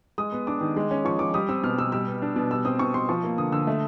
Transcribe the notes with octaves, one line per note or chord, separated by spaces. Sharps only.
G#3 D#6
B3
D4 D6
D#3
G#3
C#4
F3 C#6
F3 D6
G3 D#6
C4 E6
B2 F6
B2 E6
G3 E6
B3
D4
B2
G3 E6
C4 D#6
B2 C#6
B2 C6
F3 C#6
A#3
D3 D#6
D3 E6
A3